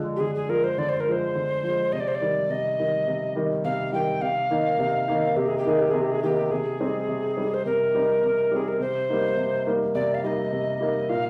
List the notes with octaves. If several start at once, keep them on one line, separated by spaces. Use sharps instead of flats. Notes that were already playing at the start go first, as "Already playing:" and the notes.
Already playing: D3 F3 G#3
G4
D3 G#4
G#4
F3 G#3 A#4
C5
D3 D5
C5
A#4
F3 G#3 C5
D3
F3 G#3
C3 D#5
D5
C5
D5
D#3 G3
C3 D#5
D#3 G3
C3
D#3 G3
C3 F5
D#3 G3 G5
C3 F5
D#3 A#3 D#4
C3
D#3 A#3 D#4
C3 G4
G#4
G4
D#3 A#3 D#4 G#4
G4
C3 G#4
G4
G#4
D#3 A#3 D#4 G4
C3 G#4
G3 C4 D#4
C3
G3 C4 D#4
C5
C3 A#4
G3 C4 D#4
C3
G3 C4 D#4 G#4
A#4
C3 C5
G3 A#3 D#4
C3
G3 A#3 D#4
C3 D5
F5
G3 A#3 D#4 D#5
C3
G3 A#3 D#4
A#2 F5